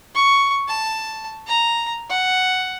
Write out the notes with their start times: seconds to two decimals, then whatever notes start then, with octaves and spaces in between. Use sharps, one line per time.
0.14 C#6
0.68 A5
1.47 A#5
2.10 F#5